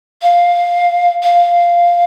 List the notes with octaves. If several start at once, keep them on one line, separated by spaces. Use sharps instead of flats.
F5
F5